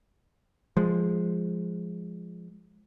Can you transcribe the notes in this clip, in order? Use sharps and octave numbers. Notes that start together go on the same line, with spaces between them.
F3 G#3